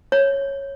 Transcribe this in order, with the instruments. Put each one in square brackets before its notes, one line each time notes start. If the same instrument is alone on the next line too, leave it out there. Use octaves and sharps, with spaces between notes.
[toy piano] C#5